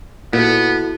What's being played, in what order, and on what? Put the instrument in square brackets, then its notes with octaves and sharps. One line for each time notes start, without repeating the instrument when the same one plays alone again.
[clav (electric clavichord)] A#2 [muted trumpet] B3 [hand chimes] E4 F#4 A4